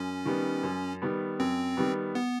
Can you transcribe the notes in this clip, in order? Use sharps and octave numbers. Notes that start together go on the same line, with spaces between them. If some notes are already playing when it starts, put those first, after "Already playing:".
Already playing: F#2 C#4
D#3 G3 B3
F#2
D#3 G3 B3
F#2 C4
D#3 G3 B3
B3